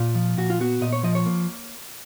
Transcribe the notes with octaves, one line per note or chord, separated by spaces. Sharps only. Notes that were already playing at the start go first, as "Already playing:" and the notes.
Already playing: A#2 F4
F3
A#2 F#4
F4
B3 F#4
A#2 D#5
C#5
F3 D#5
C#5
A#3